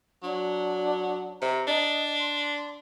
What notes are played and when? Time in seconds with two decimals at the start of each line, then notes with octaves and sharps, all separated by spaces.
0.23 F#3 D4
1.42 C3 A#5
1.68 D4 D#5
2.21 C6